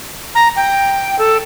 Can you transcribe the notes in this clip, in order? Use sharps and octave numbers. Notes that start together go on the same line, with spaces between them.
A#5
G5
A4